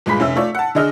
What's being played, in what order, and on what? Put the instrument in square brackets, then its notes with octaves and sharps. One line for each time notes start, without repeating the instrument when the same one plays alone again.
[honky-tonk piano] G1 A#2 G#3 G#4 B5 B6
F1 C#4 E5 E6
A3 F4 C#5 D5
F#5 A5
D3 D4 G#4 D#5 E6 F6